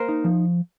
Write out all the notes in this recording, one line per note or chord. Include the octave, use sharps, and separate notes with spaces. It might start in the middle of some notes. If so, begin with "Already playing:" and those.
Already playing: A#3 A#4 C5
D#4
F3